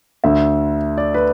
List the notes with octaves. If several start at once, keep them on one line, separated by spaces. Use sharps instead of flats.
D2 D3 E5
D5
B4